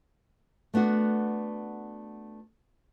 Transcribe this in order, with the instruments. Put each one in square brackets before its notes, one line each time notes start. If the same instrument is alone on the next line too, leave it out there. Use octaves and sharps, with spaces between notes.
[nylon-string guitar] A3 B3 D4 F#4